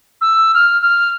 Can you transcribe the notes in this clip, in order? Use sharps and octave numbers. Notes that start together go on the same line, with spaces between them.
E6
F6
F6